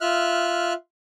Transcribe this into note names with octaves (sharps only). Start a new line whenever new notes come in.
F4 E5 F6 F#6